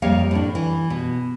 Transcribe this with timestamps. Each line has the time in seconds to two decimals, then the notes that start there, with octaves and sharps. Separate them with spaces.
0.02 F2 G3 A#3 C#5 F5
0.31 A2 D4
0.55 E3
0.90 B2